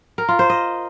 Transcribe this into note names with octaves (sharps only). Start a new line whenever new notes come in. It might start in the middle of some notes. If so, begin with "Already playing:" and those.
A#4
F4
C5
D#5